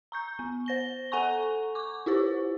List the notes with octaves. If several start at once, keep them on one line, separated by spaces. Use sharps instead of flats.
A#5 C#6 G6
B3
C5 A#6 G7
A4 F#5 G#5 A#5 C#6
C#6 D6
E4 F4 G4 C5